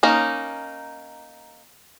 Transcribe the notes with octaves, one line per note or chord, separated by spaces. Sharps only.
A#3 C#4 D#4